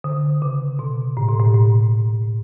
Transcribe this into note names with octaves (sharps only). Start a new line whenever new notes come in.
D3
C#3
B2
A2
B2
A2
A2